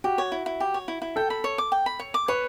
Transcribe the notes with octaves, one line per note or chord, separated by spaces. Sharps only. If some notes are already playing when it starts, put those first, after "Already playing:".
F#4 G4
C#5
E4
E4
G4
C#5
E4
E4
A4 G5
B5
C#5
D6
G5
B5
C#5
D6
B4 C#5